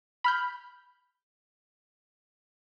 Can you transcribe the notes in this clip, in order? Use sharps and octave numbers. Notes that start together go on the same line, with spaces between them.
B5 F6 G6